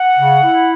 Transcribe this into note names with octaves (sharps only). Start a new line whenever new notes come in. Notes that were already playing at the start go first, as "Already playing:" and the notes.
Already playing: F#5
C#3
E4